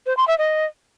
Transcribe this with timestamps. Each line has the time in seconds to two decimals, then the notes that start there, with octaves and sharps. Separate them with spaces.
0.06 C5
0.17 C6
0.28 E5
0.38 D#5